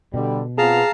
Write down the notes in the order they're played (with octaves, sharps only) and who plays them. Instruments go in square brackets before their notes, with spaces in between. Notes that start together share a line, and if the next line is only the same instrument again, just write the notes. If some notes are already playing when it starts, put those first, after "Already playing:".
[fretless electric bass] B2 [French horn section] D3 G3
[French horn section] B3 C4 F4 [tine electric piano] G#4 [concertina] F5 A5 A#5